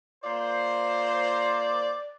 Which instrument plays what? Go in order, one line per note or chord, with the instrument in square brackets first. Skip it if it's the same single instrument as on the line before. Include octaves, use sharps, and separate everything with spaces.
[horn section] A#3 F4 C5 [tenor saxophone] D5